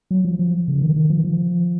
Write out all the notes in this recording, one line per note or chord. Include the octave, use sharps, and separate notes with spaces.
F#3
F3
F3
C#3
D#3
D#3
F3
F3